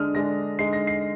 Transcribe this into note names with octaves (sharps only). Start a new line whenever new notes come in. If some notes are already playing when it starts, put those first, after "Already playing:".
Already playing: D3 G#3 D4 D#6 F6
D3 G#3 D4 A#6
D3 G#3 D#4 C7
A#6
C7